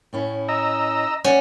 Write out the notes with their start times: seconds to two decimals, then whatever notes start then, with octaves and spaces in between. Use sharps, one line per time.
0.13 A2 C#4 E4
0.49 D#5 A#5 E6
1.24 C#4 D5 F#5